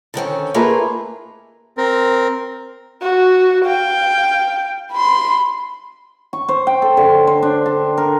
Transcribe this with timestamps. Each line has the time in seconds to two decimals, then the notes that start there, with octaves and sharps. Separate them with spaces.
0.14 D3 D#3 C4 C#4
0.54 A3 A#3 D#4 F4 G#4 B4
1.77 C4 A#4
3.02 F#4
3.65 F5 G5
4.93 B5 C6
6.33 C#6
6.49 C5
6.67 G5
6.82 A4
6.97 D3
7.27 C5
7.43 D4
7.66 A4
7.98 A#4